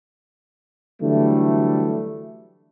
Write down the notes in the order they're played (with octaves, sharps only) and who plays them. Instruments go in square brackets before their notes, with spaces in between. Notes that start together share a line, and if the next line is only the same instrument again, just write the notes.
[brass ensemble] D3 E3 F#3 G3 A3